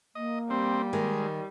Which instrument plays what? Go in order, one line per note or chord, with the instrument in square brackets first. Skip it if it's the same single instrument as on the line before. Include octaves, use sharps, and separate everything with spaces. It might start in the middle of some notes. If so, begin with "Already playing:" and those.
[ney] A#3 [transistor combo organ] D#5
[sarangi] G3 [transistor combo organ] C4
[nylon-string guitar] D#3 [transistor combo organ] G#3